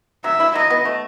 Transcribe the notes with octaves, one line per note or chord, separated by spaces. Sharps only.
F#3 E5
E4
F#3 D#5
B3
A3